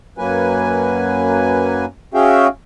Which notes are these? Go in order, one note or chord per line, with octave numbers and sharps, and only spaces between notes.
F#2 F#3 A#3 B4 G#5
C#4 F#4 G#4 E5 F5 G5